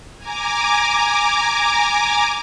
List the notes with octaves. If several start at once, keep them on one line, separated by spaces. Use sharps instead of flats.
G#5 A#5 D6